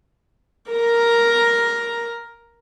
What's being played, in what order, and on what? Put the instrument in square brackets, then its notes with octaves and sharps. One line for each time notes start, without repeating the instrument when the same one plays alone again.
[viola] A#4 A#5